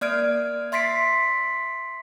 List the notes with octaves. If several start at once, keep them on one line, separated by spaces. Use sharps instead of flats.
A#3 D5 F6 G#6 D7
E5 C6 A6 B6 C7 D7